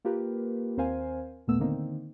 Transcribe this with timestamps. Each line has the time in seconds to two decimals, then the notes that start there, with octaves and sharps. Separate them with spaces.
0.04 A#3 F4 G4 A#4 B4
0.77 D#2 C4 A#4 C5 F5 G#5
1.47 A1 D#2 A#2 A3 B3 E6
1.60 D3 D#3 A#3 C4 D#4